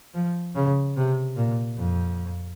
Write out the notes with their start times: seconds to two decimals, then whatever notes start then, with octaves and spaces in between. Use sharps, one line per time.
0.14 F3
0.55 C#3
0.97 C3
1.37 A#2
1.78 F2